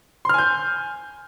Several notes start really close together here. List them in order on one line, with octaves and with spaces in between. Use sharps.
C6 F6 G#5 G6